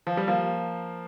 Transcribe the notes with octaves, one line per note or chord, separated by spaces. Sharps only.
F3
G3
F3 A#3